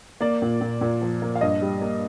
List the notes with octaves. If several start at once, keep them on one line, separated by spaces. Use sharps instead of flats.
A#3 D5
A#2
A#2
A#2
F3
A#3
F5
G2 D#5
G3
A#3